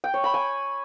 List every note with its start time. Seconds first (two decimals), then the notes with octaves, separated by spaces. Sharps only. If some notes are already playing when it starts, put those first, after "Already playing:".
0.04 G5
0.14 C#5
0.24 B5
0.34 G#5